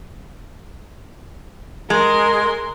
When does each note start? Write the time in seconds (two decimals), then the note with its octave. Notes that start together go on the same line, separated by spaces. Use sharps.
1.90 G#3 A#4 C6